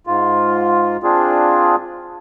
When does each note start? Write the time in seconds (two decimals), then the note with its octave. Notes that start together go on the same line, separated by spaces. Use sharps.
0.07 G#2 F4
1.03 C4 D4 F4 G#4